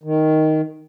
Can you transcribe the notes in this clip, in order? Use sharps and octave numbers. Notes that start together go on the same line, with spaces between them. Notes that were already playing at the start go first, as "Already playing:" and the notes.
D#3